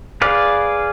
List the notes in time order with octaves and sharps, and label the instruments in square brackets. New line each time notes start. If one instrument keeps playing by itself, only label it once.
[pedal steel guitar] G#4 B4 D5 F5